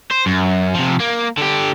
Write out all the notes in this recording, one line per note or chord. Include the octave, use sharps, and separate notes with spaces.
C5
F#2
C3 F3
A#3
D3 G4